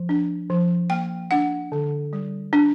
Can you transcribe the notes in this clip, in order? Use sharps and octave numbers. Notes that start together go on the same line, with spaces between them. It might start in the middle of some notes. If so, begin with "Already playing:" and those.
Already playing: F3
D4
F3
A#3 G5
D4 F#5
D3
G3
D4